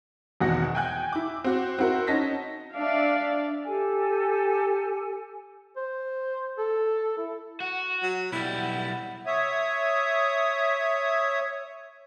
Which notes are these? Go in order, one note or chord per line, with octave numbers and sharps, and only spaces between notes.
G#1 E2 B2 F#4 F#5 A#6
G5 G#5 F#6 G6
E4 D6
C4 F#4
C4 E4 F#4 A#4
C#4 D#4 A5 A#6 B6
D4 D5 E5 F5
G4 A4 G#5
C5
A4
E4
F#4 F#5
F#3
B1 G3 E4
C#5 E5 D#6